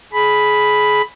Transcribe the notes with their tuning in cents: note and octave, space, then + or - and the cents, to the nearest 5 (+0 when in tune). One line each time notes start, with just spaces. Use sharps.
G#4 +25 B5 +0